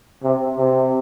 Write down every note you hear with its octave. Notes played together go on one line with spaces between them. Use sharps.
C3
C3